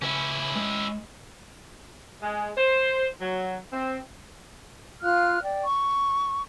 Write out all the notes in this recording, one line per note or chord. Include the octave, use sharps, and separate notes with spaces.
C#3 C#4 E4 B4
G#3
G#3
C5
F#3
C4
F4 F5 F6 F#6
D5 G5
C#6